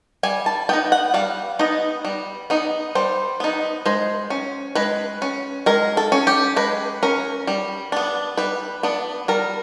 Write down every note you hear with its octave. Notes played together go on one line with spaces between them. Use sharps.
G3 G#5
A5
B3 D#4 G5
F#5
G3 F5
B3 D#4 D#5
G3
B3 D#4
G3 C5
B3 D#4
G#3 C5
C#4
G#3 B4
C#4
G#3 A#4
A4
C#4
G4
G#3 B4
C#4 A#4
G3
B3 D4
G3 B4
B3 D4
G3 A#4